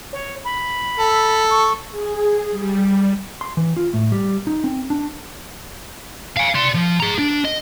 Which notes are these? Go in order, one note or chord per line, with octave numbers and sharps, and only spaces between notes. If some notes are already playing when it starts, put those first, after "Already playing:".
C#5
B5
A4
C#6
G#4
G3
C6
E3
F4
A2
G3
D#4
C4
D4
F5 G#5
D5 C6
F3
G#4 A#5
D4
D#5